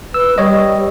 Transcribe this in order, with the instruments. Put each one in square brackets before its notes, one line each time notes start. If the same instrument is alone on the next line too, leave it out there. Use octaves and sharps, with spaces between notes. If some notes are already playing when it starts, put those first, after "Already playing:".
[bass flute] B4 [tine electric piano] E6
[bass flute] G3 [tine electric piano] C#5 D#5